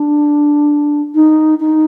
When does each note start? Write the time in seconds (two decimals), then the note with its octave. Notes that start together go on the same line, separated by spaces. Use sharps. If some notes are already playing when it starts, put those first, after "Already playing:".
Already playing: D4
1.15 D#4
1.60 D#4